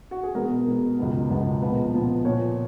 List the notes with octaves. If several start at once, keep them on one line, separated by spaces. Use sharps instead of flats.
F#4
G#4
B2 G#3 B3 A#4
B2 G#3 B3
C#2 B2 G#3 B3
C#2 B2 G#3 B3
A#2 F3 B3 B4
A#2 F3 B3
A#2 F3 B3 C#5